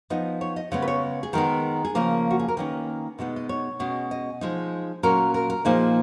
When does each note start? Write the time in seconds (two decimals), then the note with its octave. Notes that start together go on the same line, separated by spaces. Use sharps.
0.10 F3 B3 D#4 D#5
0.41 C#5
0.56 D#5
0.72 C#3 G#3 B3 C#5
0.82 B4
0.88 C#5
1.23 G#4
1.33 D#3 G#3 B3 A#4
1.85 G#4
1.95 C#3 F3 A#3 A#4
2.31 F#4
2.39 G#4
2.48 A#4
2.57 D#3 A#3 C#4 B4
3.19 B2 G#3 B3 D#4
3.36 D#5
3.49 C#5
3.80 B2 G#3 C#4
4.11 D#5
4.41 F3 G#3 D#4
5.03 A#2 F#3 C#4 A#4
5.34 A#4
5.50 A#4
5.65 A#2 F3 A#3 D#4 G#4